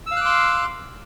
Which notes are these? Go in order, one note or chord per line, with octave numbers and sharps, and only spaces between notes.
F5 C6 D6 E6 F#6